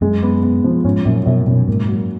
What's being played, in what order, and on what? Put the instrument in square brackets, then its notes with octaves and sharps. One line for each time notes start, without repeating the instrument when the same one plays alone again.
[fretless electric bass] F#2 [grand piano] G#3
[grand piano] B3
B3
F3
[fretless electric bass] G#2 [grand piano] C#4
[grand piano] F#2 [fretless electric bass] A#2
[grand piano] F#2 [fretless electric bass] B2
[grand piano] F#2 [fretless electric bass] B2
[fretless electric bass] G#2 [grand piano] A#3
[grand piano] F#3